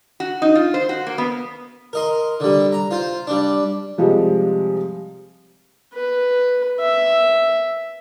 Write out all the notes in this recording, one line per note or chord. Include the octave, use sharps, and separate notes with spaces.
F#4
D#4
F4
C5
F#4
A#3
B3
A#4 D#5 C6
D3 G3
A#5
F4 C5
G3 D4
C3 F3 G3 G#3
B4
E5